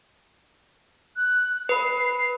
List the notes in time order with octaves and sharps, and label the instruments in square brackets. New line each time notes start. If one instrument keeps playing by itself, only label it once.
[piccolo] F#6
[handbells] B4 B5 [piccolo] C7